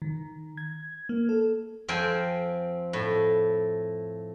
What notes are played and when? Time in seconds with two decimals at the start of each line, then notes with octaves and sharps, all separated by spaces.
0.02 D#3
0.57 G#6
1.09 A#3
1.29 A4
1.88 F2 C4 G5 G#5
2.93 A2